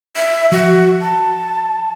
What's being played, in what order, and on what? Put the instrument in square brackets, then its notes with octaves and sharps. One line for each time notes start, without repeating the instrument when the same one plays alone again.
[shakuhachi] E5
[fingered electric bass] F3 [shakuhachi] F#4
[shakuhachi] A5